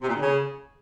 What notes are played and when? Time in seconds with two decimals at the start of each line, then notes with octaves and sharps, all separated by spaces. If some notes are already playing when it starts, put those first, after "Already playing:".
0.01 C3
0.08 A#2
0.14 D3
0.21 C#3